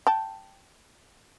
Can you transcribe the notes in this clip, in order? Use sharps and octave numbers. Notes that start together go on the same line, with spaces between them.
G5 A5